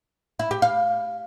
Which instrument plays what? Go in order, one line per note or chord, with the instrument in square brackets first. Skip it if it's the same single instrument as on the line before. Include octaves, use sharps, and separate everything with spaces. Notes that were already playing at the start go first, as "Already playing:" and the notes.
[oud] E4
G4
F5